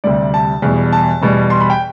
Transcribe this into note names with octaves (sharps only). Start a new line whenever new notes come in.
D2 C3 G3 D5
A5
E2 B2 G3
A5
E2 B2 G3
C6
B5
G5